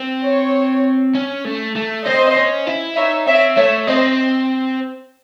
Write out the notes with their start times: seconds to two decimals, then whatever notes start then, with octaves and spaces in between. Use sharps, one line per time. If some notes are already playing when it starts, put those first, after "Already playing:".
Already playing: C4
0.23 C#5
1.15 C#4
1.45 A3
1.76 A3
2.05 C4 C5 D#5
2.36 C#4
2.67 E4
2.96 D#4 C#5 E5
3.26 C4 C#5 E5
3.57 A3 C#5 E5
3.87 C4 C5 D#5